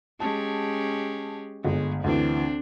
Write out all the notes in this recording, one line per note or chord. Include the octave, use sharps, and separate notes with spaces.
G#3 C#4 G4 A5
G1 G#3
D2 E3 C4 D4